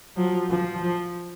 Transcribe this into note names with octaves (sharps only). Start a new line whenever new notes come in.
F3 F#3
F3
F3